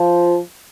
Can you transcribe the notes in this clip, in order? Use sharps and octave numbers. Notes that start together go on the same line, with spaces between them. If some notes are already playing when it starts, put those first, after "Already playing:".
Already playing: F3